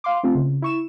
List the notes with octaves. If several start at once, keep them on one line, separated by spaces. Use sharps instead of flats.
F5 C6 D6
A3 C4 F4
C#3
E4 C#6 E7